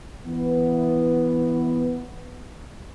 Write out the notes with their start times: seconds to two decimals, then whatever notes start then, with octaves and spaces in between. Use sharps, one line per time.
0.25 E3 B3